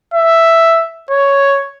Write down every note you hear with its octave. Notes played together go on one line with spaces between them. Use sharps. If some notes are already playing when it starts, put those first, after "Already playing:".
E5
C#5